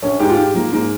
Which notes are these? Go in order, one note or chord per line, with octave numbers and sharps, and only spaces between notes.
A#1 C#4
G#2 G4
F4
G#2 G4
F3 A#3
G#2 A#3